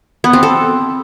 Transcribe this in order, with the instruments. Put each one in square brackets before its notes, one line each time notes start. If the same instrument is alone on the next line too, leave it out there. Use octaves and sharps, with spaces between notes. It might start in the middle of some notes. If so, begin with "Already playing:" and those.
[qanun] B3
C4
A4